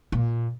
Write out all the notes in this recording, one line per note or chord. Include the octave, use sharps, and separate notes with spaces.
A#2